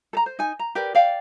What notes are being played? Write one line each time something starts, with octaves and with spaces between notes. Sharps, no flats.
A4 A#5
C5
D#4 G#5
A#5
G4 A#4 B4 D5
D5 F5 G5